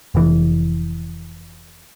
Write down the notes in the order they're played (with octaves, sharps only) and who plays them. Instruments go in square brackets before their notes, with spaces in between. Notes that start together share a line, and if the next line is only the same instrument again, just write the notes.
[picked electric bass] F1 E3